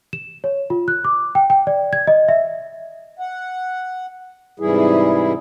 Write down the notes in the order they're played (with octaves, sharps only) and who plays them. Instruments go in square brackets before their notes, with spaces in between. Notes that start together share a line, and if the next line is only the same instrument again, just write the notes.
[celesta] E7
C#5
F4
F#6
D6
G5
G5
D5
G#6
D#5
E5
[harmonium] F#5
G#2 C3 E3 G3 E4 G#4